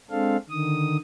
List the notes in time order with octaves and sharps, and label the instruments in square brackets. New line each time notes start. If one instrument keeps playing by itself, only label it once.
[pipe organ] G#3 C4 D4 A4 F5
D3 D#3 D#6